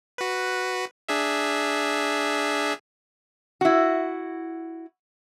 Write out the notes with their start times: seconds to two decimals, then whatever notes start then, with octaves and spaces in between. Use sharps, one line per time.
0.18 F#4 B4
1.09 D4 G#4 E5
3.61 E4 F#4